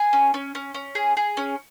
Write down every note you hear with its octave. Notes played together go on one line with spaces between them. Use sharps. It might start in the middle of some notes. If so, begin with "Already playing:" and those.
Already playing: G#4 G#5
C#4
C#4
C#4
C#4
G#4
G#4
C#4